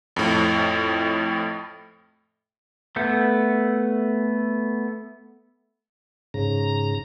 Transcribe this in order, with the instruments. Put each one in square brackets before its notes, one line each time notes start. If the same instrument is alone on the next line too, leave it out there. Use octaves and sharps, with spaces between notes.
[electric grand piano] F2 A2
[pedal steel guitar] A3 B3 A4 G6
[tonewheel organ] G#2 C#3 A#5